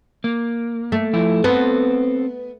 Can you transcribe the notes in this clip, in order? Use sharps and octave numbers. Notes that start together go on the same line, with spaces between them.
A#3
A3
F3 E4
B3 C4 A4